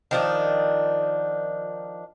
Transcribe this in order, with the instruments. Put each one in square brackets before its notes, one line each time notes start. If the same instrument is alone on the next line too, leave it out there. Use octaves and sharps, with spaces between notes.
[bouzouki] D#3 F3 D4